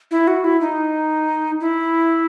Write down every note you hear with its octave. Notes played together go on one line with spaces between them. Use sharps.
E4
F#4
E4
D#4
E4